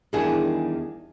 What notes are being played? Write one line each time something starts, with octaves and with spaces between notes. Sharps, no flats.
E2 D#3 G3 D4 G#4 F#5